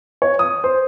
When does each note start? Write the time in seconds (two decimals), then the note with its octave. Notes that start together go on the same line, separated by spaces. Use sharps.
0.22 C#5
0.39 D#6
0.64 C5